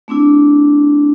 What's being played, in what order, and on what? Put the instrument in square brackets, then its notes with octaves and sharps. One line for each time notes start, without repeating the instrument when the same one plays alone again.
[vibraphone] A3 C4 D4 E4